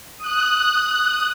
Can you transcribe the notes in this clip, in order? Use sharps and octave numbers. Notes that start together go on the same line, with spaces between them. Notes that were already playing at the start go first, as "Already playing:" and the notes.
D#6 F#6